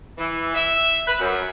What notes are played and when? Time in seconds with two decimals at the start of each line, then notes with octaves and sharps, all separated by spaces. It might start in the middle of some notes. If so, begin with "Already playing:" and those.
0.18 E3
0.55 E5
1.07 B4
1.19 F#2